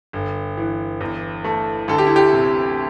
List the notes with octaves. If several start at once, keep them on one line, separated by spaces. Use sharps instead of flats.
G1
E3
E2
A3
D2 A4
G4
E4
G4
C3